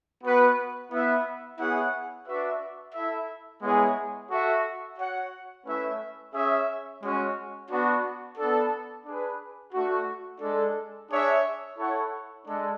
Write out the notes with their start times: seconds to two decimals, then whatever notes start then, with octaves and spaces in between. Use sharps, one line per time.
0.22 B3 F#4 B4 F#5
0.90 B3 E4 B4 E5
1.58 B3 E4 G#4 C#5 F#5
2.26 D4 F#4 B4 E5
2.93 E4 A4 E5
3.61 G#3 B3 E4 G#4 C#5
4.29 F#4 A4 E5
4.97 F#4 C#5 F#5
5.65 A3 C#4 E4 B4 E5
6.33 C#4 G#4 C#5 E5
7.01 G#3 C#4 F#4
7.69 B3 D4 F#4
8.37 B3 D4 A4
9.05 D4 G#4 B4
9.73 A3 D4 F#4
10.41 G#3 D4 A4
11.09 D4 G#4 C#5 E5
11.77 E4 A4 C#5 F#5
12.45 G#3 D4 A4